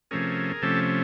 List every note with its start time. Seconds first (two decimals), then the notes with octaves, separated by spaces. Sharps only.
0.11 C3 F3 A3 C#4 G#4 A#4
0.62 C3 F3 A3 C#4 G4 A4